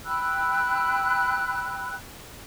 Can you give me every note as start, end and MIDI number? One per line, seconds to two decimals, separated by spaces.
0.06 1.95 79
0.06 1.95 83
0.06 1.95 88
0.06 1.95 90